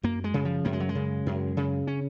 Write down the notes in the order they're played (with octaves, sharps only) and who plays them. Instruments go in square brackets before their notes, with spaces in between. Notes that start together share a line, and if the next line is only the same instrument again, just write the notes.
[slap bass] F#2 A#3
G#3
C#3
F3
F#2 A#3
G#3
F#3
G#3
C#3
F#2
C#3
C#4